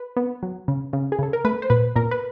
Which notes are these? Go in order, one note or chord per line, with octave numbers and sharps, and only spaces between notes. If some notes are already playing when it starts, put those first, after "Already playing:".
Already playing: B4
B3
F#3
C#3
C#3
G#4
C#3 A4
A#4
A3 B4
C5
A#2 B4
A#2 A#4
B4